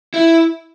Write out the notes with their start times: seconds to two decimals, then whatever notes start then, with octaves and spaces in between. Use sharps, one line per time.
0.14 E4